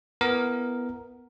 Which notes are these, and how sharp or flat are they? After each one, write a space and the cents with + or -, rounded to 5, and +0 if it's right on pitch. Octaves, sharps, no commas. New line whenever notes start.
B3 +0 E4 +30 A#4 +0